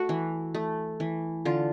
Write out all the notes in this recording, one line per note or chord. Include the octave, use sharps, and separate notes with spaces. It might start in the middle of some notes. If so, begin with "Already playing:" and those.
Already playing: A3 F#4
E3
A3
E3
D3 F4